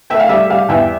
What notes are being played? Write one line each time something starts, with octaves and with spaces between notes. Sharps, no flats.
A3 E5 G5
F5
G3 E5
G3 F5
E2 E5 G5